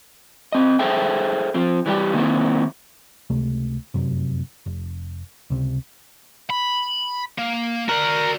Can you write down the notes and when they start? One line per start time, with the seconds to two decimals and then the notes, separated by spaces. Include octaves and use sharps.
0.52 C4 D#5
0.79 G#4 A4 C5 E5 G5
1.54 F3 C4
1.86 E3 G3 D#4 G4
2.13 D#3 A#3 C4 E4
3.30 C#2 C3 A3
3.94 F1 F#2 C3
4.66 F1
5.50 C#2 C3
6.50 B5
7.38 A#3
7.89 F#4 A#4 D5